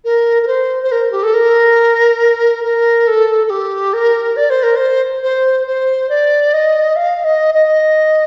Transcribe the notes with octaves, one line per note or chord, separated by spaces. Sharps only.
A#4
A#4
C5
C5
A#4
G4
A4
A#4
A#4
A4
A4
G4
A#4
D5
C5
A#4
C5
C5
C5
D5
D#5
F5
D#5
D#5